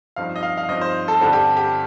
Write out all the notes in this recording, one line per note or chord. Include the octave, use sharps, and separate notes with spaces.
G2 F3 C4 D#4 F5
D#5
F5
F5
G2 F3 C4 D#4 D#5
C5
A4
G2 D3 G3 C4 A4
G4
G4